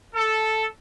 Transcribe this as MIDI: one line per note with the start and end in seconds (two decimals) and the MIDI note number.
0.14 0.65 69